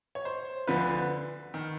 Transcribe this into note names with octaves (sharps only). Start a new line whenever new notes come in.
C#5
C5
D2 D3 F3 B4
D#3